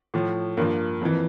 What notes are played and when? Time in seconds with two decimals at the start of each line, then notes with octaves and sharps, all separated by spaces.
0.14 A2 F3
0.57 G2 F3 A#3
1.02 F2 E3